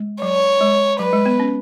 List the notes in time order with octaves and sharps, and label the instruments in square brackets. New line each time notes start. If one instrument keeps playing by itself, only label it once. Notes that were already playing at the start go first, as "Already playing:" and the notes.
Already playing: [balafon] G#3
[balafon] F#3 [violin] C#5
[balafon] G#3
[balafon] F#3 [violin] B4
[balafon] G#3
B3
C#4